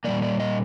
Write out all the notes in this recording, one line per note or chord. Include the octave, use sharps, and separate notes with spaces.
A#2 G3 A#3 D5
D5
D#5